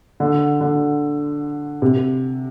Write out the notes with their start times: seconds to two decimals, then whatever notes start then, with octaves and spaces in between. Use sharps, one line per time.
0.20 D3
0.61 D3
1.82 C3